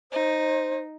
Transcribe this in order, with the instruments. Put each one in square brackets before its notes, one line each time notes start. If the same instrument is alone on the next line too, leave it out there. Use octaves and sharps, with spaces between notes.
[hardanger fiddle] D#4 [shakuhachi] C5